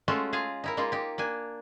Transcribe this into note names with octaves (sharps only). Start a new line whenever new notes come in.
G#3 A3 C#4 F4 F#4 A4
F4 G#4 F5 G#5 A#5
D#4 E4 A#4
G#3 A#3 D#4 F4
D#4 G4
A#3 D4 G#5